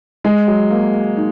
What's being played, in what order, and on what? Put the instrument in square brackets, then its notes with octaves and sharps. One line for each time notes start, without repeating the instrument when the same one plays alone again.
[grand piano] G#3 [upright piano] G#4
[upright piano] F#3
A#3
A#3
D#4